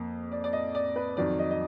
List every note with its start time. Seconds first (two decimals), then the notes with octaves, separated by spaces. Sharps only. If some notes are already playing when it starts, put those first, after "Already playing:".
Already playing: F2 A#3
0.32 D5
0.44 D5
0.53 D#5
0.75 D5
0.96 B4
1.17 F2 D#3 F#3 D5
1.39 D#5
1.51 D#5